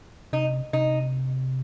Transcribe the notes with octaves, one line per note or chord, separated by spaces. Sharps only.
C3 D#4
C3 D#4